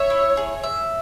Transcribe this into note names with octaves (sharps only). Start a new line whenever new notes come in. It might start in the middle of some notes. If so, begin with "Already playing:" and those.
Already playing: C#5 E5
E4
G#4
E5